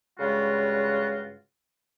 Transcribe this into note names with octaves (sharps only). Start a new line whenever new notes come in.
G2 C#3 G#3 F4 F#4